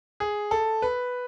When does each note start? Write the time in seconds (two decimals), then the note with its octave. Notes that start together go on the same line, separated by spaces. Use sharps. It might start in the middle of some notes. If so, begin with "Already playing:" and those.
0.20 G#4
0.51 A4
0.82 B4